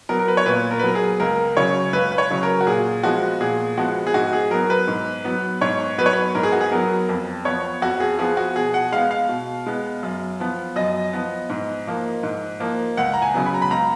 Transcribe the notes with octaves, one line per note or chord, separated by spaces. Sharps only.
F#3 B3 A#4
A#4
B4
C#5
A#2 B4
A#4
B4
F#3 B3 A#4
G#4
C#2 A#4
C#3 F#3 C#5
C#2 B4
B4
C#5
C#3 F#3
A#4
F#4
A#2 G#4
F3 G#3 B3 F#4
A#2 G#4
F3 G#3 B3 F#4
G#4
G#2 F#4
G#4
F#3 B3 A#4
B4
G#2
F#3 B3
G#2 C#5
F#3 B3 B4
C#5
B4
G#2 A#4
G#4
F#4
G#4
F#3 B3 A#4
F2
F3 B3 C#5
F2 F#4
G#4
F3 B3 G#4
F#4
B2 G#4
F#5
G#3 B3 F5
F5
B2
G#3 B3
F#2
F3 B3
F#2 D#5
F3 B3
G#2
F3 A#3
G#2
F3 A#3
C#2 F#5
A#5
G#5
C#3 F#3 B3
B5
A#5
B5
C#2 A#5